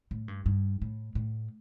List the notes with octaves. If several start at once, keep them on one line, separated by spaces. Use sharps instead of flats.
A2
G2
G2
A2
A2